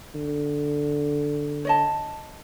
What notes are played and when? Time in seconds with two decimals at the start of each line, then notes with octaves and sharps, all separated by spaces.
0.15 D3
1.65 C#5 D#5 A5